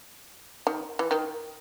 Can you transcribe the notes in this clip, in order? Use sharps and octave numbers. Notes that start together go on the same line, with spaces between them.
D#3
E3
D#3